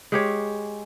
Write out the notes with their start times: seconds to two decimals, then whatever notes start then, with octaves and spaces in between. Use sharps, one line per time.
0.12 G#3 G4 C#5